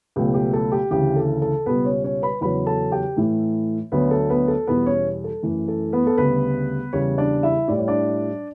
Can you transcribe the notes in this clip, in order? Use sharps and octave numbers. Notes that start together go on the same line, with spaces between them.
C#2 B2 F#3 A3 G4
G4
A4
G4
D2 C#3 E3 G4
A4
A4
C#2 B2 G3 B3 B4
C#4 C#5
C#4 C#5
B4 B5
E2 C#3 F#3 B4 B5
A4 A5
G4 G5
A2 E3 A3
D2 D3 F#3 B3 B4
A4
B3 B4
A4
E2 B2 G3 B3 B4
C#4 C#5
A4
F#2 E3 A3
A4
B3 B4
A4
D2 C#3 G3 B3 B4
E2 C#3 G3 C#4 C#5
D4 D5
E4 E5
A2 G3 D5
C#5
D4 D5